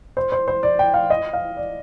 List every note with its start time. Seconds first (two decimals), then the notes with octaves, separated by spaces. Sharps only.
0.17 C5
0.32 C5
0.48 C5
0.63 D5
0.79 G5
0.94 F5
1.10 D#5
1.33 F5
1.57 D5